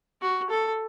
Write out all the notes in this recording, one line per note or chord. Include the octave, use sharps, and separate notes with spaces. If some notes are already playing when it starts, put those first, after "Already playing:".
F#4
A4